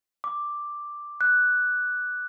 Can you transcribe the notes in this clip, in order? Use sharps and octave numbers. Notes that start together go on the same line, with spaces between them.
D6
F#6